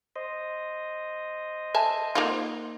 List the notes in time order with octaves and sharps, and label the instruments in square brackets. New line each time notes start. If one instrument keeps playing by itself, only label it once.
[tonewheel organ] C5 D#5
[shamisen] E5 G#5 A5
A#3 D#4 F4